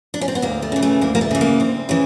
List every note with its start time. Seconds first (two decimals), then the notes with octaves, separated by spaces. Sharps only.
0.14 D4
0.21 C#4
0.28 C4
0.35 B3
0.42 D2 A#3
0.62 A3
0.72 C#3 E3
0.83 A3
1.01 D2 A#3
1.15 A#3
1.21 A3
1.31 C#3 E3
1.41 A#3
1.60 D2 C4
1.89 C#3 E3